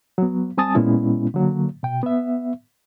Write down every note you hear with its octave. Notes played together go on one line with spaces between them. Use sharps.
F#3 B3
G3 C4 G#5 A5 D#6 A6
A#2 G#3 B3 C#4 E4
D3 F#3 A#3
B2 G5
B3 E5